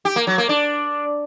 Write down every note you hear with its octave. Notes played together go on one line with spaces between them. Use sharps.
G4
A#3
F#3
A#3
D4